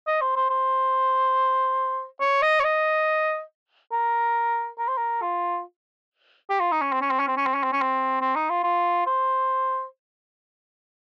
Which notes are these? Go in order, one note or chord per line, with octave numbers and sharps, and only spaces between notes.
D#5
C5
C5
C5
C#5
D#5
C#5
D#5
A#4
A#4
C5
A#4
F4
G4
F4
D#4
C#4
C4
C#4
C4
C#4
C4
C#4
C4
C#4
C4
C#4
C4
C4
D#4
F4
F4
C5